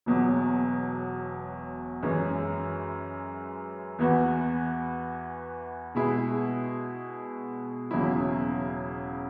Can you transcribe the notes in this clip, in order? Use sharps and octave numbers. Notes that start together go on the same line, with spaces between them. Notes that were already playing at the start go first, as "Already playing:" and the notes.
E1 E2 B2 F#3
F#2 E3 G#3 C#4
E2 E3 B3 F#4
B2 G#3 E4 G#4
E1 E2 C#3 F#3 E4